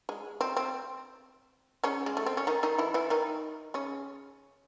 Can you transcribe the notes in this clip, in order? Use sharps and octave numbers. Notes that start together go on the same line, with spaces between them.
G#3
C4
C4
C#3 C#4
G#3
A3
C4
C#4
D#3 D#4
D#3 D#4
E3 E4
E3 E4
D#3 D#4
C#3 C#4